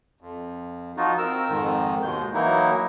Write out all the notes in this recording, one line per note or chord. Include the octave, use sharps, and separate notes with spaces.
F2
F3 D#4 F4 F#4
C4 A#4 E6
F2 G#2 D#3
D#2 B2 G#3 G6
E3 F#3 A#3 D#4 E4